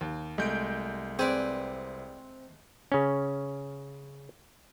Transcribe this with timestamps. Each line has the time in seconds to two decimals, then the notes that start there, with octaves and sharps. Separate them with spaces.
0.01 D#2
0.38 C2 G#3 A3 G6 D7
1.19 C4 G#4 B4 D5
2.92 C#3 C#4